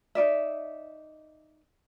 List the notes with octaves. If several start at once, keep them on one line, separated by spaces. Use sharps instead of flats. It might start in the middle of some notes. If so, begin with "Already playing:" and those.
D#4 F4 D5 E5